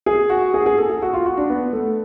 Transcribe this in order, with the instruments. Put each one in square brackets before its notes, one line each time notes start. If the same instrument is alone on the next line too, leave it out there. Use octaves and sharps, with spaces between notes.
[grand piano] G#4
F#4
G#4
G#4
A4
G#4
F#4
F4
F#4
D4
B3
A3